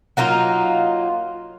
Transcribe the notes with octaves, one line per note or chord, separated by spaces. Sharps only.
F#3 A#3 D#4 F4